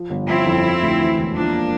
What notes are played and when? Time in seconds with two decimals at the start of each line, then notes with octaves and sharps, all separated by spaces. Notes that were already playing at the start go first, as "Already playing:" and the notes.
Already playing: F3
0.10 G1
0.28 F3 C4 E4
0.46 F2
0.64 F3
0.82 D2
1.01 E3
1.18 E1
1.36 F3 A#3 D4